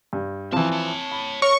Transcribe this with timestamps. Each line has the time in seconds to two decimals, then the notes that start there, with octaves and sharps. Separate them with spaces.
0.13 G2
0.53 E2 E3 F3 C4 A5
0.72 C#5 A5
1.11 B5
1.42 A#4 C#5 C#6